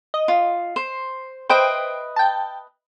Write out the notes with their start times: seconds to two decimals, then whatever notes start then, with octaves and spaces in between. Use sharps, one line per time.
0.14 D#5
0.28 F4
0.76 C5
1.49 B4 C5 D#5 E5 G5 D7
2.16 G5 A5